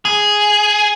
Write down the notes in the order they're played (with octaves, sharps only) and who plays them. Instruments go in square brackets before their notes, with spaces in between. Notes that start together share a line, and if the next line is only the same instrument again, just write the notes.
[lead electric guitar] G#4